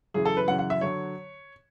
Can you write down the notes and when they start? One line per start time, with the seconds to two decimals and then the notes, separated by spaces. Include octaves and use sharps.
0.14 F#2 C#3 E3 G#4
0.25 A4
0.37 B4
0.48 F#2 C#3 E3 F#5
0.59 F#5
0.70 E5
0.81 D3 F#3 C#5